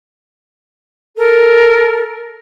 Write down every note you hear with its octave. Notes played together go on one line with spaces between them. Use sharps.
A4 A#4